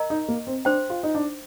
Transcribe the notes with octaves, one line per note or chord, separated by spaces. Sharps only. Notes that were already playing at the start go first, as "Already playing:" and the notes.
Already playing: A#4 D#5 A#5
D#4
A#3
C4
D4 C5 G5 C6
F4
D#4
D4